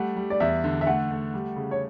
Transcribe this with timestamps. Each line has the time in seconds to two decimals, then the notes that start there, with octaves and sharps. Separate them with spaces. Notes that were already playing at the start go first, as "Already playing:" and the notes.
Already playing: G3 A3 F#5
0.16 G3
0.30 D5
0.40 E2 E5
0.64 D3
0.81 E5
0.87 A3 F#5
1.11 A3
1.34 G3
1.56 C#3
1.71 C#5